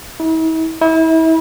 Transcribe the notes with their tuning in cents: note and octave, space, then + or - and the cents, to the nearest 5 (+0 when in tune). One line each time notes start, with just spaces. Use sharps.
E4 -45
E4 -35